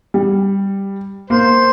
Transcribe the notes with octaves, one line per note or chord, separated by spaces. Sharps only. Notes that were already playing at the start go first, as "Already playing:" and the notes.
G3
A#3 C5